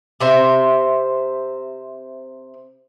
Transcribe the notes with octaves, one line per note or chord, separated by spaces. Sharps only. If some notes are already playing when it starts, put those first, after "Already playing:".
C3 C5 E5